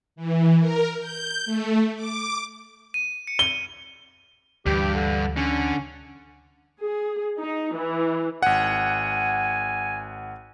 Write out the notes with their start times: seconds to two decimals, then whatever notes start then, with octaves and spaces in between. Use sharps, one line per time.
0.16 E3
0.59 A#4
0.99 G6
1.45 A3
1.95 D6
2.94 D#7
3.27 C#7
3.39 G7
4.66 D2 G2 E3 G4
4.95 D3
5.37 D3 C#4
6.81 G#4
7.39 D#4
7.77 E3
8.42 G#1 F#5 G#5